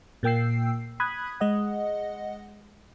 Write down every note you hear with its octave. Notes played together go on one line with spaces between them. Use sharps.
A#2 A#3 G5 E6 C7
B5 D#6 F#6 G#6
G#3 D#5 F#5